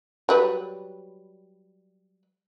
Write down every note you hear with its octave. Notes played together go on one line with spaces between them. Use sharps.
F#3 G3 B4